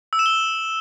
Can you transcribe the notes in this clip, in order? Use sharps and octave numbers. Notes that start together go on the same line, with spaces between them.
E6
E7
G7